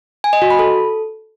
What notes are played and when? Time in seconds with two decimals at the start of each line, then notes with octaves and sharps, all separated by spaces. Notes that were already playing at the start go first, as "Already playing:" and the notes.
0.24 G#5
0.33 D#5
0.42 F#4
0.50 B5
0.59 A4